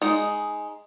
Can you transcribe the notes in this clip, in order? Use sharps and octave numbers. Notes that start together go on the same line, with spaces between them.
G#3 D#4